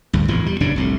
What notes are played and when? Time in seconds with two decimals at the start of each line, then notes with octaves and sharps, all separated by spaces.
0.13 D2 G2
0.28 E1 E2 A2 F3
0.46 G3
0.60 F#1 G2 C#3 D4
0.76 F1 C2 A2